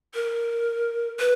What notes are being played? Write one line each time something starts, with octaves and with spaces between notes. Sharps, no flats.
A#4
B4